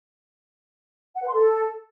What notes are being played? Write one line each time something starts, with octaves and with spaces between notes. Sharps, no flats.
F#5
B4
C6
A4